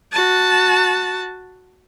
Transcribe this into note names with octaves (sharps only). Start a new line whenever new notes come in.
F#4 A5